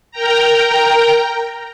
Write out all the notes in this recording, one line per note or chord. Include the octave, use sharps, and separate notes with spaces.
A#4 G5 A#5